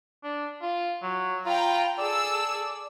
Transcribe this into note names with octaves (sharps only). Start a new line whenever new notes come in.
D4
F4
F#3
F4 G5 A#5 B5
G#4 A4 D5 E6